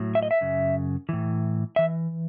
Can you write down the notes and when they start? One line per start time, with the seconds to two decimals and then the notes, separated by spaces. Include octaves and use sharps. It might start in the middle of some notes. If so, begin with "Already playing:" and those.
Already playing: A2 F#3
0.15 E5
0.23 D#5
0.31 E5
0.41 F#2 C#3
1.09 A2 E3
1.76 E3 E5